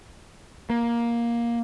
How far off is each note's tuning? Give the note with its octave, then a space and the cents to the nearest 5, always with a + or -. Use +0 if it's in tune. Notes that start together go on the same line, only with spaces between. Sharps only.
A#3 +10